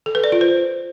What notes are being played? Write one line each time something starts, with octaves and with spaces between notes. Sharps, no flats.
A4
B4
D5
F4
C5